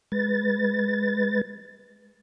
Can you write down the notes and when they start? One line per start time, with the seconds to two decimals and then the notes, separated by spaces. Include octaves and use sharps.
0.12 G#3 B4 A6